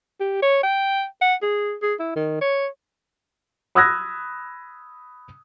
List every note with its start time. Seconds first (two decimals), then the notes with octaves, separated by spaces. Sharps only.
0.20 G4
0.42 C#5
0.63 G5
1.21 F#5
1.42 G#4
1.82 G#4
2.00 E4
2.16 D#3
2.41 C#5
3.75 B5 D#6 E6 F#6 G#6 A#6